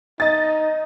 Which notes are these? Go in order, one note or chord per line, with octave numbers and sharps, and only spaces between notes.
D#4 D#5 A6